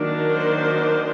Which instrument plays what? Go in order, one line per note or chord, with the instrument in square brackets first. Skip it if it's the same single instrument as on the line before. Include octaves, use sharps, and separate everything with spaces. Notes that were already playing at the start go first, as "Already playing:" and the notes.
Already playing: [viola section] D#3 F#3 A#3 D4
C5